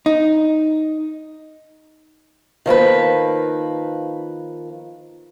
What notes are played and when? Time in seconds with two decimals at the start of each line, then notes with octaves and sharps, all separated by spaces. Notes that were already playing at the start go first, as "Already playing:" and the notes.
0.06 D#4
2.66 D#3 F3 A#3 B4